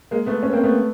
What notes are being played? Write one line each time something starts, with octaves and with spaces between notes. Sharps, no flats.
G#3 A#3
A3 B3
B3 C#4
A#3 C4
A3 B3